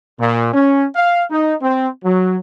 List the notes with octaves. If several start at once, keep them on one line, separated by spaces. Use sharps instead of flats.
A#2
C#4
F5
D#4
C4
F#3